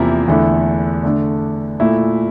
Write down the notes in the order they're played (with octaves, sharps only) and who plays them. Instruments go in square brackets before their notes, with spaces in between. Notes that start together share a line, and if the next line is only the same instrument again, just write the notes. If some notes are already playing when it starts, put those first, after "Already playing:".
Already playing: [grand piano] E2 C3 F3 A#3 E4
E2 D3 A3 E4
D3 A3 D4
A#2 A3 E4